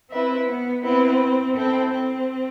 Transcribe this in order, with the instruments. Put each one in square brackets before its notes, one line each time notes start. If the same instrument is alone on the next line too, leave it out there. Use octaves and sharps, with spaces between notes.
[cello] C4 [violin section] E4 B4 E5
[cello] B3
[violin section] B3 E4 B4 [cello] C4
[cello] C4 [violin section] E4 A4 C5 G5
[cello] C4